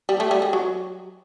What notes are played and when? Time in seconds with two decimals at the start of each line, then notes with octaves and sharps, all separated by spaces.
0.09 G3
0.20 A3
0.31 G3
0.42 G#3
0.53 F#3